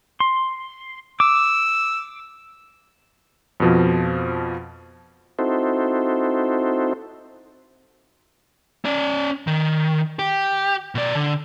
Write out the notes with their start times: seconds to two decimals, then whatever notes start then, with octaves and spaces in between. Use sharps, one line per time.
0.20 C6
1.20 D6 E6
3.60 F2 B2 F3
5.39 C4 D#4 E4 F#4 A4 C5
8.85 C#4 D5
9.47 D#3
10.19 G4
10.95 B2 D5
11.15 D3